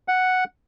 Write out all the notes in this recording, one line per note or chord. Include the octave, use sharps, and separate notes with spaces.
F#5